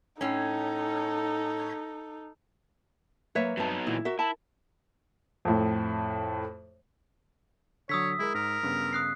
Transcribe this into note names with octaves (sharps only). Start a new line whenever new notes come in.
A2 C#4 D#4 A4
F#3 A#3 B4 C#5 E5
G2 F#3 B3 C4 D#4 A5
A#2 D3 E3 E4
F#4 A#4 E5
E4 A5
F2 A2
D3 F#3 C#5 D#6 E6 B6
G#3 E4 G#4 A#4
G#2 A#4
G2 C#3 B3
D#6 F#6 C7